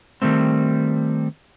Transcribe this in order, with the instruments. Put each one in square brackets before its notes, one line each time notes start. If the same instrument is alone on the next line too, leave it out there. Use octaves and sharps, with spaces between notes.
[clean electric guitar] D#3 G3 A3 C4